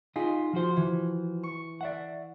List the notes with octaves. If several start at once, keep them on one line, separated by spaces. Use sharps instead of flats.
D#4 F4 G#4 B6
F3 F#4 C5
E3
C#6
D5 E5 F#5